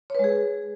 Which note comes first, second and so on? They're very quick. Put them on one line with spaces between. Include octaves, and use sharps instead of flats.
C#5 B4 G#3 G#4